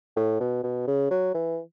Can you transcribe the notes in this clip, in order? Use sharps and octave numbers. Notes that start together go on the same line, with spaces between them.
A2
B2
B2
C#3
F#3
E3